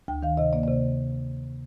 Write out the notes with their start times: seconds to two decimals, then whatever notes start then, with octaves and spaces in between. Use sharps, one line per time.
0.08 D2 G5
0.23 D#3 F5
0.37 C3 D#5
0.53 A#3 D5
0.63 D5
0.68 C3